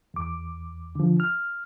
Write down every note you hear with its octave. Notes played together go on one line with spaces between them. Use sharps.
E2 D6
D3 F3
F6